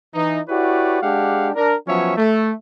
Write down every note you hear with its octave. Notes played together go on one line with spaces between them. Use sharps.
E3 D#4
E4 F#4 G4 B4 C#5 D5
G#3 D4 G4 F5 F#5
D4 A#4
F3 F#3 B3 C#4 C#5 E5
A3